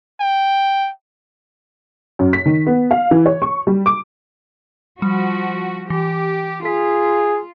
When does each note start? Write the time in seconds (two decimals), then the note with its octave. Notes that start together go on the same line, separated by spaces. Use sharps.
0.20 G5
2.19 F#2
2.33 B6
2.46 D#3
2.67 B3
2.91 F5
3.11 E3
3.26 C#5
3.42 C#6
3.67 G3
3.86 D6
5.02 F3 G3 F#4
5.90 E3 G4
6.65 F4 G#4 B6